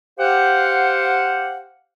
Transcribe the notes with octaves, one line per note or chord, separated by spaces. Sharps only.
G4 C5 F5 F#5